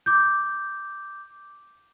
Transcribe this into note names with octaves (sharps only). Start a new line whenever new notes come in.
D6 G6